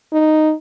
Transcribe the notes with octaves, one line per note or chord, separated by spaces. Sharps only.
D#4